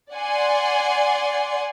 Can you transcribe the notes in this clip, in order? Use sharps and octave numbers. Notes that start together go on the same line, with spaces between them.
D5 F#5 G#5 C6